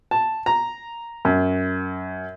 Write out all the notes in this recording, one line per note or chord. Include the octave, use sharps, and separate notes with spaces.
A5
A#5
F#2